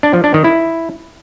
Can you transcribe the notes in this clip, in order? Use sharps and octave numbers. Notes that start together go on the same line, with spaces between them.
D4
F3
D4
D#3
E4